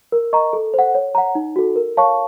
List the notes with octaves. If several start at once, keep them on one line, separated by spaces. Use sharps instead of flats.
A#4
D#5 A#5 C#6
A4
C5 F#5
C#5
F#5 A#5
D#4
F#4 A4
A#4
C#5 F5 A5 C#6